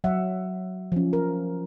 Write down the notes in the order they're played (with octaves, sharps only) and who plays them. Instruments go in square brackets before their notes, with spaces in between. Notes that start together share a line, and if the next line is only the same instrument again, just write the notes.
[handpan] F#3 E5 F#5
F3 C#4
A#4